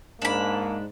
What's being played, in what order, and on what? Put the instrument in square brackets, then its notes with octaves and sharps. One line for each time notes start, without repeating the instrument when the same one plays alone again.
[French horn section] G#2 [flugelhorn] A#3 [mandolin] D4 B5